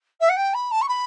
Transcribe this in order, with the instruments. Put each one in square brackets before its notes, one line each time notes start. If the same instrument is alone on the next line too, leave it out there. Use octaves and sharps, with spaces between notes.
[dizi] E5
F#5
G5
B5
A5
C#6
B5